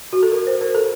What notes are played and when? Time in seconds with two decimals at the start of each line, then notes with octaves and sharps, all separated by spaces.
0.13 F#4
0.23 A4
0.32 A#4
0.47 C5
0.61 A#4
0.75 A4